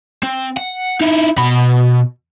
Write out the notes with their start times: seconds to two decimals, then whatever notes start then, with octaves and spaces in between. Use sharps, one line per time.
0.23 C4
0.57 F#5
1.01 D#4 E4
1.37 B2 B5